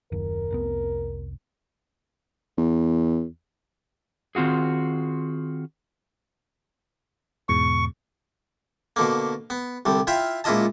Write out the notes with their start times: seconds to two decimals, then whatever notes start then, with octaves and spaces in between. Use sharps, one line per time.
0.12 F#1 D#2 A#4
0.51 F1 C2 B3
2.57 E2
4.35 D#3 C4 F4 F#4 G#4
7.49 E2 G#2 B2 C#6
8.96 B2 D3 A#3
9.50 B3
9.85 C2 D3 G3
10.07 E4 F4 E5 F5 G5
10.44 C#2 A#2 E4 F4 D#5 A5